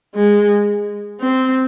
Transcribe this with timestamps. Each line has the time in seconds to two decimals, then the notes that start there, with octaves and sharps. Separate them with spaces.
0.15 G#3
1.20 C4